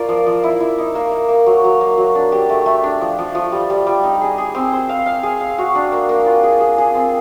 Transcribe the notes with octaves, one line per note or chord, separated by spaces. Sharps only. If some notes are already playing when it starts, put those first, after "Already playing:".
Already playing: F4 A#4 D5
F3
F3
E4
E4
D#4
A#3
A#3
A#3
F#3
F#3
A#3
F#3
D4
G4
A3
A3
D4
F3
F3
F3
G3
G3
G3
D#4
G#4
G#4
C4
C5
F5
F5
G#4
F5
F#4
D4
A#3
A#3
F4
G#4
G#4
G#4
C4